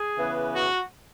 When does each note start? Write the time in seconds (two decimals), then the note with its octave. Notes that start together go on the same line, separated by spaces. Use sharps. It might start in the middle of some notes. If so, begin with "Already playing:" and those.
Already playing: G#4
0.17 C#3 E3 B3
0.53 F#4